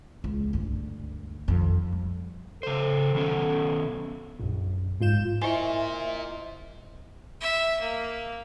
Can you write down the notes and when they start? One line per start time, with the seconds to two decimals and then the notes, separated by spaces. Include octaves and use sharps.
0.24 C#2
0.53 D2 G2
1.48 F2 D#3
1.93 G3
2.63 C#3 A4 C5
3.15 D#3 B3 C#4
4.40 A#1 F#2
5.01 G#2 F4 G6 E7
5.42 E4 F4 A#4 C5 D#5 E5 G#5
7.41 E5
7.81 A#3